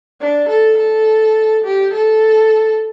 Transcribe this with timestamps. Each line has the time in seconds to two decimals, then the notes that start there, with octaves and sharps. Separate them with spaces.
0.20 D4
0.49 A4
0.78 A4
1.65 G4
1.93 A4